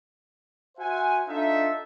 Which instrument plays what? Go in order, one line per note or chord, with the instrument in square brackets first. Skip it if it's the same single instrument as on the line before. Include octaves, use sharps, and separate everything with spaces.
[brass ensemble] F#4 C5 E5 F#5 G#5
D4 D#4 F4 A4 D#5 E5